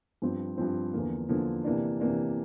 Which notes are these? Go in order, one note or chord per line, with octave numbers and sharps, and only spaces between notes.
G2 F3 C4
G2 F3 C4
E2 D3 F3 A#3
E2 D3 F3 A#3
C3 E3 A#3 D4
C3 E3 A#3 D4